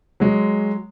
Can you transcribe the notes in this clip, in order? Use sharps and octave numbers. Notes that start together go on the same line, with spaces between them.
F#3 G#3